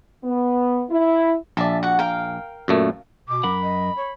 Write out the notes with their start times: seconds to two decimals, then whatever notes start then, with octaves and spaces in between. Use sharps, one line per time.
0.23 B3
0.90 E4
1.57 A#1 D5 E5 A5
1.83 F#4 F#5
1.99 A#4 F5 G5
2.68 F#2 A#2 A3
3.28 B2 D6
3.43 F#2 A#4 F#5 B5
3.63 D#5
3.96 C#5